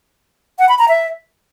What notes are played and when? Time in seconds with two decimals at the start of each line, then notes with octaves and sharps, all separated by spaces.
0.59 F#5
0.69 B5
0.79 A#5
0.89 E5